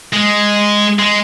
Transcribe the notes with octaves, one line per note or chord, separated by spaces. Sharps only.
G#3
G#3